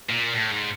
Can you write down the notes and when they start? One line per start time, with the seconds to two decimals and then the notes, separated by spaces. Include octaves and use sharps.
0.09 A#2
0.34 A2
0.51 G#2